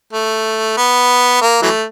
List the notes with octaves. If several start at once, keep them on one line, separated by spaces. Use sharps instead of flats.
A3
B3
A#3
E3 F#3 A3